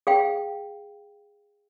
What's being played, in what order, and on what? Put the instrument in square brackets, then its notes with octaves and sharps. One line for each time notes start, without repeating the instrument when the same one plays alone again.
[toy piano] G#4 F5 G5